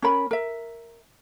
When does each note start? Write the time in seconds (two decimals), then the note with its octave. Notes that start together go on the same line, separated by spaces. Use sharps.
0.02 C#4 A#4 B5
0.31 A#4 E5